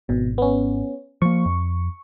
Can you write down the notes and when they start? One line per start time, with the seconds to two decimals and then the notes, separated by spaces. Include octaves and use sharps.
0.09 G#1 B2
0.38 B3 C#4
1.22 F3 A#3 C#6
1.45 F2